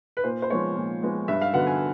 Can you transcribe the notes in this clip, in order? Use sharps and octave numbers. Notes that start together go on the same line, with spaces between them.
B4
A#2 C5
C5
F3 G#3 B3 C#5
A#2
F3 G#3 B3
G2 E5
F5
D3 F#3 B3 F#5
G#5